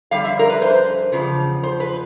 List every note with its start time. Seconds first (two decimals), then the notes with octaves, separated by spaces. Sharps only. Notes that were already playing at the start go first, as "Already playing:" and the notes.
0.11 F2 D3 G3 F5
0.25 E5
0.39 A#4
0.50 B4
0.62 C5
1.12 E2 C#3 F3
1.63 C5
1.80 B4